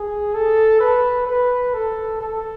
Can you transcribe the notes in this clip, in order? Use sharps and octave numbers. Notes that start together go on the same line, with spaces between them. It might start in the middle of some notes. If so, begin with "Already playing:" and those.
Already playing: G#4
A4
B4
B4
A4
A4